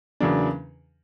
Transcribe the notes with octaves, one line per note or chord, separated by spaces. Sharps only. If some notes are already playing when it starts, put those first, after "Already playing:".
E2 C#3 F#3 A#3 D4